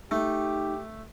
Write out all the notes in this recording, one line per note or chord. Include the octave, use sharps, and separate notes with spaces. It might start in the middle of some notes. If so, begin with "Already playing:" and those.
A3 D#4 G4